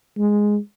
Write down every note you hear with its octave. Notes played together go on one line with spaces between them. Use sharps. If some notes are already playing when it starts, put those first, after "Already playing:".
G#3